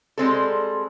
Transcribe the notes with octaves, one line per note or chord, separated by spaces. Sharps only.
G3 G#3 C4 A4